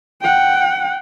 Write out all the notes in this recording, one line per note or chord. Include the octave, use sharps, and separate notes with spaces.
F#5 G5